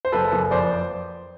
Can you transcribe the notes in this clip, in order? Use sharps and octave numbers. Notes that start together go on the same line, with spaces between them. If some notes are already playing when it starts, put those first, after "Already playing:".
C5
F#1 A4 B4
F#1
F2 C5 D5